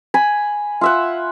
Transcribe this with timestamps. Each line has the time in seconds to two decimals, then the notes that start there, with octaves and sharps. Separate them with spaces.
0.14 G#5 B5
0.81 F4 E5 F#5